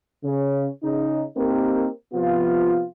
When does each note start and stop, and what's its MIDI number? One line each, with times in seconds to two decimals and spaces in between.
0.23 0.67 49
0.83 1.23 49
0.83 1.23 63
1.36 1.87 58
1.36 1.87 60
1.36 1.87 63
1.36 1.87 67
1.36 1.87 70
2.14 2.84 48
2.14 2.84 53
2.14 2.84 59
2.14 2.84 65